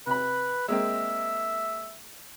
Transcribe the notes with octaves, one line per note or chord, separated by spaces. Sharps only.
C3 B4 B5
G#3 A#3 C4 E5